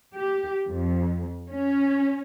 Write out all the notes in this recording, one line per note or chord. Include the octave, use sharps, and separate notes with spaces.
G4
F2
C#4